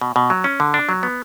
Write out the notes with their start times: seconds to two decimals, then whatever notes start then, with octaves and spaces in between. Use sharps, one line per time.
0.01 B2
0.16 B2
0.30 F#3
0.44 C#4
0.60 D3
0.74 D4
0.89 F#3
1.03 B3